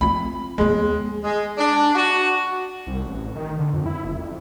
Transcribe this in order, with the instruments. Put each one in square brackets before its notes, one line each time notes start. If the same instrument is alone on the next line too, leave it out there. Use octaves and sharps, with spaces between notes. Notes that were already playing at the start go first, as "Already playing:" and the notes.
[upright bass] C4 F4 [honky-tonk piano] B5
[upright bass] D#2 B3 [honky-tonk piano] G#3
[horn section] G#3
D4
F#4
[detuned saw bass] C2
A1
D#3
D3
F2
E4
F#1
F2